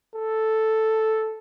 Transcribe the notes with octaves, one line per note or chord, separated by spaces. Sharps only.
A4